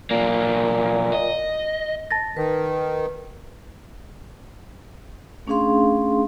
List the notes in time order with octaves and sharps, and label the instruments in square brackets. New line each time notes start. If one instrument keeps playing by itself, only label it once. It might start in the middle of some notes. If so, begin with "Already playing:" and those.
[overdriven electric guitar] B1 A#3 [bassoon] A#2
[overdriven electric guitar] D#5
[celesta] A5 A6 A#6
[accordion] D#3 [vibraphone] B4
[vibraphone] A3 C#4 D4 G#4 F5 C6